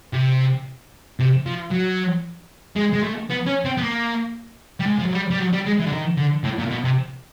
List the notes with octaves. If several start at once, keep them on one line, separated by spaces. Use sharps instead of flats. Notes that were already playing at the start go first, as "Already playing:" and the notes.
C3
C3
F3
F#3
G#3
G#3
A3
B3
C#4
C4
B3
A#3
G3
G#3
F3
F#3
G3
G3
F#3
G3
G#3
E3
D3
D#3
D3
A2
A#2
B2
C3